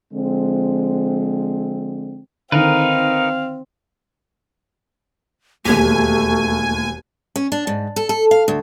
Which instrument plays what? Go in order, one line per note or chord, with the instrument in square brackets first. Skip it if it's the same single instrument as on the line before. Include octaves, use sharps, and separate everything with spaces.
[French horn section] D3 F3 G#3 C4
[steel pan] D3 D#3 [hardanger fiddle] C4 [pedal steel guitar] D#4 A#4 B4 [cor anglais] F5
[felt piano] E1 D#2 [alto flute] A3 [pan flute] G4 [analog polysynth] G#5
[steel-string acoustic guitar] C#4
D4
G#2
A4
A4
F5
D2